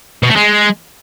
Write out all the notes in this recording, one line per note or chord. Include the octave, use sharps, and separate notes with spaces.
B2
A3
G#3